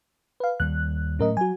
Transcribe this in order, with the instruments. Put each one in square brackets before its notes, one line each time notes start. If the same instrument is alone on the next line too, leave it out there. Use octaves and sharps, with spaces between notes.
[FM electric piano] B4 F5
[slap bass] D#2 G3 [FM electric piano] F#6
[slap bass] A2 F#3 A3 [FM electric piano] C#4 A#4 D#5
[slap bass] F#3 [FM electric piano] F#4 G#5